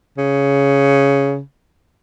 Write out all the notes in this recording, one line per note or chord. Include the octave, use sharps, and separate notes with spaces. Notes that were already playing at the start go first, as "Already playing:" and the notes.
C#3